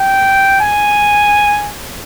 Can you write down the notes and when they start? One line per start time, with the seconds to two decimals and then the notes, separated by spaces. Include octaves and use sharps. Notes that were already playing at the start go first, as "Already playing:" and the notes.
Already playing: G5
0.61 G#5